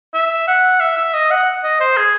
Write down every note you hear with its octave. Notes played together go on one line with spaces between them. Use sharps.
E5
F#5
E5
E5
D#5
F#5
D#5
C5
G#4